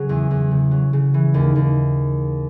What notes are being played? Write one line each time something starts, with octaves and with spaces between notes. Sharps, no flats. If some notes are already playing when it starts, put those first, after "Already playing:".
Already playing: C#3 F#3 G#4
E2
E2
C#3
F#3
C#3
E3
D#2
D#2